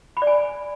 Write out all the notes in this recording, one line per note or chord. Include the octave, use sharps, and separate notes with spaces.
B5
D5
G#5